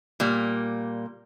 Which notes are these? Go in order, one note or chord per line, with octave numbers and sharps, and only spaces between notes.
A#2 G3 A#3